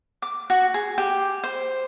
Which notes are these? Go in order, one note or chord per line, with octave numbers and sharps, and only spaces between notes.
D6
F#4
G#4
G4
C5